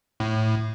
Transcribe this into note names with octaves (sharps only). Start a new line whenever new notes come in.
A2